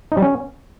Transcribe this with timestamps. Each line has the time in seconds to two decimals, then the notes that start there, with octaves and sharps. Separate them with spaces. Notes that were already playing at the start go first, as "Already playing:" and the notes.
0.12 D#4
0.17 G3
0.22 C#4